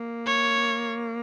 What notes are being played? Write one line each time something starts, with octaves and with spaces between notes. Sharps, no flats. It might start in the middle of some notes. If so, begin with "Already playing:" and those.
Already playing: A#3
C#5